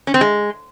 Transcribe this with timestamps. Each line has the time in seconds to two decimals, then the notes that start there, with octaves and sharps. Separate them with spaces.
0.07 C#4
0.14 C4
0.21 G#3